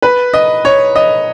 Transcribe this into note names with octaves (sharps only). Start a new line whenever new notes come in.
B4
D#5
C#5
D#5